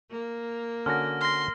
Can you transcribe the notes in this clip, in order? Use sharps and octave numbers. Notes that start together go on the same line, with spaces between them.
A#3
D3 C#4 F#4 F6 A#6
C6 F6 A#6